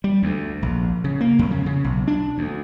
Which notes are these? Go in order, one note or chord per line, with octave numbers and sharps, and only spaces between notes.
G3
D2
A#1
C#3
A#3
F2
C#3
C#3
B1
D4
D2